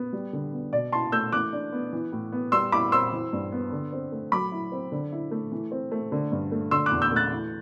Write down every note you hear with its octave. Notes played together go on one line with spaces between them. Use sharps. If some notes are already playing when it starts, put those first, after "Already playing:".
Already playing: B3
G3
D3
B3
B2 D5
E4 A5 C6
A3 E6 G6
E3 D6 F#6
D4
B3
E3
A2
B3
G3 C6 E6
E4 B5 D6
C4 C6 E6
E3
G2
B3
D3
C4
A3
F#3 B5 D6
E4
C4
D3
E4
A3
E3
C4
A3
D3
G2
A3
D3 C6 E6
D6 F#6
E2
E6 G6
A3 F#6 A6
E3